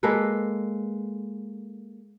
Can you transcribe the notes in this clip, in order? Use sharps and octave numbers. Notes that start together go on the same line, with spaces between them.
G#3 A#3 A4 B4